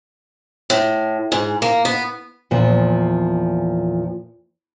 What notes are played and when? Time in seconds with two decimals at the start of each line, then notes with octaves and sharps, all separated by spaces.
0.70 A2
1.32 G#2
1.62 A#3
1.85 B3
2.51 E2 A#2 F3